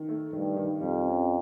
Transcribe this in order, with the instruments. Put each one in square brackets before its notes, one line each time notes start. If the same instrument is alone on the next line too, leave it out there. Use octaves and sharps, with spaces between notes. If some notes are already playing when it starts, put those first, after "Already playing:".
Already playing: [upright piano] D#3
A3
[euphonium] G2 [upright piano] D#3
[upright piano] D#3
[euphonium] F2 [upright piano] G3
[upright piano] C#4